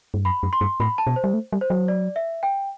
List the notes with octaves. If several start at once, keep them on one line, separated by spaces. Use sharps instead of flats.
G2
F#2 B5
F#2
C6
G2
A2 B5
A5
B2
C5
G3
A3
G3
C5
F#3
D5
E5
G5